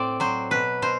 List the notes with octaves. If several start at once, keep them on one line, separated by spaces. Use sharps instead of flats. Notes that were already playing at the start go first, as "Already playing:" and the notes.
Already playing: A2 C4 D5
F#3 C5
B2 B4
B2 C5